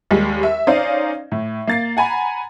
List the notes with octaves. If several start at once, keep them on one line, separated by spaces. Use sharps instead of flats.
D#2 G3 G#3
E5
C#4 D#4 C5 D5 D#5 F5
A2
A#3 A6 C7
F#5 G#5 A#5 B5